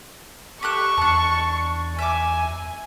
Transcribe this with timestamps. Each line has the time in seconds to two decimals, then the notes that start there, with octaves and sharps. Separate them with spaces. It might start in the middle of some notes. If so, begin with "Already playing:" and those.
0.63 G4 A4 C#6 F#6
0.97 E2 D4 A5
1.99 E5 G#5 D6